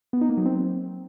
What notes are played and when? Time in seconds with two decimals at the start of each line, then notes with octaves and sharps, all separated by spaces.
0.13 B3
0.21 D#4
0.29 A#3
0.37 F#3
0.45 C4